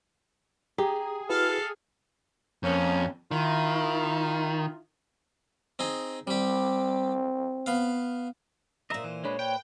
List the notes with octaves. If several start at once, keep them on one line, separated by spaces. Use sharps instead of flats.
G4 G#4 A#5
E4 F#4 A4 B4 F5 F6
F2 A#3 C#4
D#3 E4 F4
C4 D#4 G#4
G3 C4 G4
B3 F5
A#2 C5 D#5 E5 A#5
E3
G#3 D4 B4 C#5
B4 G5